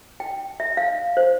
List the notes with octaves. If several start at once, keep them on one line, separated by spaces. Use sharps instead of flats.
G5
E5
F5
C5